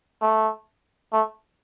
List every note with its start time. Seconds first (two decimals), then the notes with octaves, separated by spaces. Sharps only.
0.22 A3
1.13 A3